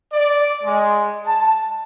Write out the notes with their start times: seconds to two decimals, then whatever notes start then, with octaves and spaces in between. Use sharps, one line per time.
0.13 D5
0.64 G#3
1.26 A5